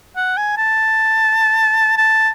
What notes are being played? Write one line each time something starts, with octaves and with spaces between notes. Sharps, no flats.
F#5
G#5
A5
A5